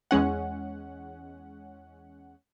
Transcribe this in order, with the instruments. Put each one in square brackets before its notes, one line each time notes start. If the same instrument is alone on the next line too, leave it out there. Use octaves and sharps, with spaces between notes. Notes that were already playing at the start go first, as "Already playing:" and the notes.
[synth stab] E2 G#3 C#4 F#5